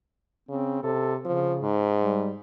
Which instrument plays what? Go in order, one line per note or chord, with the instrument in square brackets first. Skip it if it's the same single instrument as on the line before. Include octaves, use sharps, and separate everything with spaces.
[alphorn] C#3 [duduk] C4
[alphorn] C3 [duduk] A4
[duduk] C#3 [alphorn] F3
[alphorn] G#2
[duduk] G3